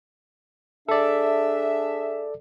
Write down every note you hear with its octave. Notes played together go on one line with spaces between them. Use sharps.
D4 G#4 A4 D5 E5